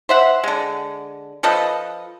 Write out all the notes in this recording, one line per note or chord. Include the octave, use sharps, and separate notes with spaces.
C5 E5 F#5
D3 G#3
F3 A4 B4 D#5